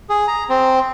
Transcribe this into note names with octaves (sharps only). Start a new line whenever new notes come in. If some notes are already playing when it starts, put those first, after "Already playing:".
G#4
A#5
C4